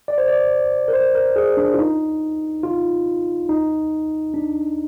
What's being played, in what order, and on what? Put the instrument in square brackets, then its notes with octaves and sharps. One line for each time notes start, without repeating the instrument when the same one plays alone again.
[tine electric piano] D5
C5
D5
A#4
C5
A#4
G#4
D4
F4
D#4
F4
D#4
D4